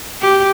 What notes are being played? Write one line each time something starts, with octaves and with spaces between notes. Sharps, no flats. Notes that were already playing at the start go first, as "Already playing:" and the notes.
G4